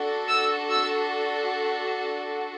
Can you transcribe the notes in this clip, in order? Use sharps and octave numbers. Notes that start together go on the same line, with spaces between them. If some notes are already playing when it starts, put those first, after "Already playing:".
Already playing: D4 F#4 A4
E6
E6